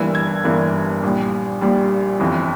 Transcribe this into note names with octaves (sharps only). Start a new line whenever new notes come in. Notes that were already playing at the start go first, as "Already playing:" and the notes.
Already playing: G1 G2 E3 A#3 E6
G#6
G1 G2 E3 A#3
A#1 A#2 G3
A#1 A#2 G3
G1 F2 E3